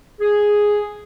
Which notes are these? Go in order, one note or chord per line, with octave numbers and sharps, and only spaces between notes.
G#4